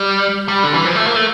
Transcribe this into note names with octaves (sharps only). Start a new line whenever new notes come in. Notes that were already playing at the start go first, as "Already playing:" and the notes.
Already playing: G3
G3
D3
E3
F3
A3
A#3
A3